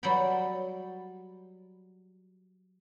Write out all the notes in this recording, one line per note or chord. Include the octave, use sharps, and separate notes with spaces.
F#3 G3 D5 G5 B5